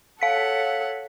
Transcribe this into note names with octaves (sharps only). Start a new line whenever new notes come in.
A4 C#5 F5 F#5 B6